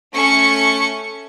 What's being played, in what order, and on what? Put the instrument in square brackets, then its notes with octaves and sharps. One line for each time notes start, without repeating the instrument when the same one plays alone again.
[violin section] A3 C#4 C#6 C#7